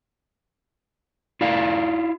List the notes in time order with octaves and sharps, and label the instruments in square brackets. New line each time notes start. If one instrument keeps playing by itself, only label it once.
[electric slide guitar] E4 F4 D5 F5